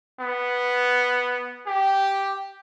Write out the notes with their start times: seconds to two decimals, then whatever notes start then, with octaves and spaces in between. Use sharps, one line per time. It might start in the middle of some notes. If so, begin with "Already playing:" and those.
0.20 B3
1.67 G4